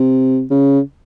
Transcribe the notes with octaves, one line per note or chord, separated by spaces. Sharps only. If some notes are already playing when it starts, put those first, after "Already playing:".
Already playing: C3
C#3